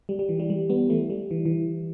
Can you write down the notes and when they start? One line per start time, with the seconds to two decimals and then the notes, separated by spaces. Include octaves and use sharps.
0.09 G3
0.19 G3
0.29 E3
0.39 G3
0.50 G3
0.70 G3 B3
0.90 E3 A3
1.10 G3
1.31 E3
1.46 E3